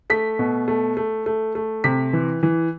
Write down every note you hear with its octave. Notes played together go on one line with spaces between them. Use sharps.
A3 B6
B2
A3
A3
A3
A3
C3 B6
E3
E3